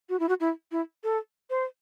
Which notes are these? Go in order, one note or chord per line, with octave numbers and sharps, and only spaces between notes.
F#4
E4
F#4
E4
E4
A4
C5